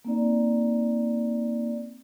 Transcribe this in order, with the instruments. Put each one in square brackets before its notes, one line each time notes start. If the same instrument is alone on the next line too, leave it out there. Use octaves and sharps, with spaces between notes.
[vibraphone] A#3 C4 D#4 D5